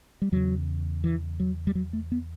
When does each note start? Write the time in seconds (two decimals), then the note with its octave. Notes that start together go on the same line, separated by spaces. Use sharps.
0.22 G3
0.32 E2 C#3 F#3
1.04 E3
1.40 F#3
1.67 G3
1.75 F#3
1.93 A3
2.12 B3